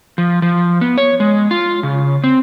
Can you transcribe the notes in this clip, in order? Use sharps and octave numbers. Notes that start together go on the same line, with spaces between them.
F3
F3
B3
C#5
G#3
F4
C#3
C4